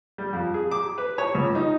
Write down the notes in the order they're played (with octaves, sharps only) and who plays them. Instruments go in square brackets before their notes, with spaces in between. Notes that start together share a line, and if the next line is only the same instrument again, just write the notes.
[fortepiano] G3
F2
G#4
D6
B4
C#5
C#2
D#4